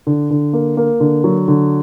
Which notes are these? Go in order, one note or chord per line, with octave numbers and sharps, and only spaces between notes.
D3
D3
A#3
A#3
D3
F#3
D3